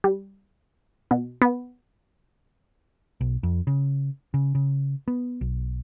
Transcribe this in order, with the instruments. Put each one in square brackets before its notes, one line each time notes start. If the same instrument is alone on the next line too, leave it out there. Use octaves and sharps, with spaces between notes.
[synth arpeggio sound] G3
B2
B3
[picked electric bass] B1
F2
C#3
C#3
C#3
B3
B1